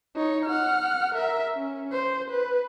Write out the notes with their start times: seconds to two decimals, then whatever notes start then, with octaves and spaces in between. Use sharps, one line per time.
0.15 D#4 C#5
0.45 F#5 F6
1.15 A#4 E5
1.55 C#4
1.92 C5
2.30 B4